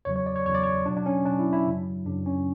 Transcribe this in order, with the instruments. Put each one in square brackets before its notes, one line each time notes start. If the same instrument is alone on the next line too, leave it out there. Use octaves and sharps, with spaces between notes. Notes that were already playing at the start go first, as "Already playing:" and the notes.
[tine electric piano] E2 C#3 F#3 C#5
C#5
D5
C#5
E2 C#3 F#3 C#5
D5
C#5
B2 F#3 D4
D4
C#4
B2 F#3 D4
E4
E4
F#2 C#3 F#3
F#2 C#3 F#3 D4
C#4